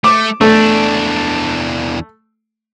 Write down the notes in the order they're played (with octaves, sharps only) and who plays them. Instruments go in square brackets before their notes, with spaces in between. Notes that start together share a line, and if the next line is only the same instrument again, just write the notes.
[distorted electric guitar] A3 [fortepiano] D6
[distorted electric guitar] E2 D4 [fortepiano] A3